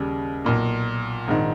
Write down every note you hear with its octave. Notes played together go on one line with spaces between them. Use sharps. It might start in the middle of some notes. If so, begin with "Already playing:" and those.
Already playing: D#2 C#3 G3
B1 A#2 A#3
A#1 G#2 D#3